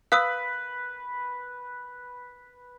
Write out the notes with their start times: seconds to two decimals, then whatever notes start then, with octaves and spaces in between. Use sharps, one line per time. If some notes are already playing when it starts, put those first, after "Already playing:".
0.12 B4 F5 D#6 E6